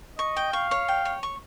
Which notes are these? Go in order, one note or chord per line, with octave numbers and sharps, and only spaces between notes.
D#5 C#6
G5
F5 C#6
C#5
G5
C#5
C#6